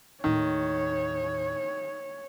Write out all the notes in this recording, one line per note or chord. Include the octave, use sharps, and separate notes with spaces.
D#2 A2 D#3 C#5